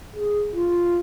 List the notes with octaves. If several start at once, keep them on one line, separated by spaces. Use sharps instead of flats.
G#4
F4